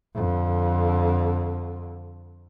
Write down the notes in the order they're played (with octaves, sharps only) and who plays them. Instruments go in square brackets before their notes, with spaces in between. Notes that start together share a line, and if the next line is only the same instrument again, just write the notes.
[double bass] F2 D3